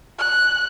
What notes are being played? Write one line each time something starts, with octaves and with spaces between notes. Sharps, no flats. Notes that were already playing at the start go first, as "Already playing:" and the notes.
F#6